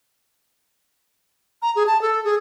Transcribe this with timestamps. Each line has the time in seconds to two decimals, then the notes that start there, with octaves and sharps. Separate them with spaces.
1.62 A#5
1.76 G#4
1.87 A5
2.02 A4
2.24 G#4